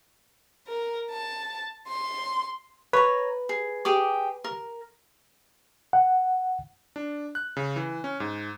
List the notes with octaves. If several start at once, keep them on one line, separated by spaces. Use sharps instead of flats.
A#4
A5
C6
B4 C#5 A#5
G#4
G4 G#4 D6
A#4
F#5
D4
F#6
C#3
E3
C#4
G#2